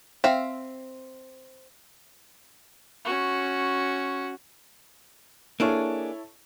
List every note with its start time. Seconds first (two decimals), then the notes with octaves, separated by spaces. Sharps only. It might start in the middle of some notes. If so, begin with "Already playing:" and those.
0.24 C4 E5 F5
3.05 C#4 F#4
5.60 A#3 D4 E4 G#4 A4 C#5